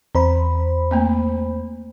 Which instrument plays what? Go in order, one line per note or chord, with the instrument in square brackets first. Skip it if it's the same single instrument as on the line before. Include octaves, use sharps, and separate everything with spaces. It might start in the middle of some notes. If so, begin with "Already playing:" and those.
[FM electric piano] E2 C5 B5 [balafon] C4
[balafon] A3 A#3 C4